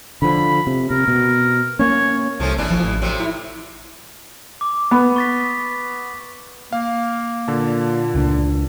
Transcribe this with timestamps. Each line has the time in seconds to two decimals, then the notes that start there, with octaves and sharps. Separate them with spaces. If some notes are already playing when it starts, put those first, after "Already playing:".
0.22 D3 F3 B5
0.67 C3
0.91 C3 A#4
1.08 B2
1.79 A#3 C#4 C#5
2.40 C2 F3 A3 C#4
2.58 G#1 B2 E3 D4
2.71 F3
2.84 A1
3.02 A2 C3 F#3
3.20 E4
4.61 D6
4.91 B3
5.16 C#6 A6 B6
6.73 A#3 F5
7.48 A#2 D3 A5
8.14 C#2 C#4 D4